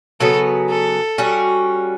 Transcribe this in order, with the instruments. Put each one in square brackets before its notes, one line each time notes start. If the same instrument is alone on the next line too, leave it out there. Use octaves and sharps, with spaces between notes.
[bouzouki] C#3 F#3 B3 [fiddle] A4
[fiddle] A4
[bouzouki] G3 C#4 F#4